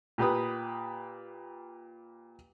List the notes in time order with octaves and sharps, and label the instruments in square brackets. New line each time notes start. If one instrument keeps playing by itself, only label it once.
[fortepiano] A#2 G4 B4 D#6